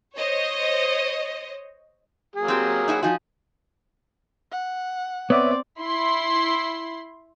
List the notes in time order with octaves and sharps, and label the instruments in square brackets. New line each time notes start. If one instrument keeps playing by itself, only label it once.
[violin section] C5 C#5 D#5
[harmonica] F#3 A#3 G#4
[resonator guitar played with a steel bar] C4 G4
D#4 E4 F#4
[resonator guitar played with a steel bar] F3 D#4 F#4 [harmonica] G#5
[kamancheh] F#5
[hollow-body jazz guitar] B3 [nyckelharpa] C4 D5 [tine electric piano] C#5 E5 D6
[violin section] E4 C6